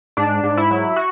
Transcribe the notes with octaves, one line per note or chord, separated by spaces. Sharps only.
G#2 D4
G#2
E4
F#3
F#4